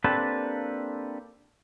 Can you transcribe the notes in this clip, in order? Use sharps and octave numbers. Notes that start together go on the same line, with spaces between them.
A#3 C4 D4 G4 A4 B4